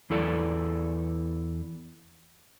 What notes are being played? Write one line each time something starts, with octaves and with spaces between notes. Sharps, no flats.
E2 E4 A4 D5